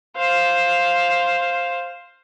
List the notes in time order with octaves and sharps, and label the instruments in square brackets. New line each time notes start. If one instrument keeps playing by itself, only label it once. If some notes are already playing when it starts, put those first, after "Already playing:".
[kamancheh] C5 F5